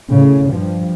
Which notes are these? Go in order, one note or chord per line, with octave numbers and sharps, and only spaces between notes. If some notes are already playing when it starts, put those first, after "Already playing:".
A2 C#3
G2 F3